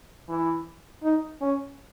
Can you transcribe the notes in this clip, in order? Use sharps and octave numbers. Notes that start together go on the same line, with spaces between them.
E3
D#4
C#4